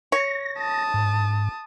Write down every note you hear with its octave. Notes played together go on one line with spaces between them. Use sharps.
C#5 A#6
A5 D#6
G#2